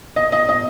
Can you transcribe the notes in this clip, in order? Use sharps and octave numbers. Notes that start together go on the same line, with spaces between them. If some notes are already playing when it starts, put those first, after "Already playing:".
D#5
D#5
D#5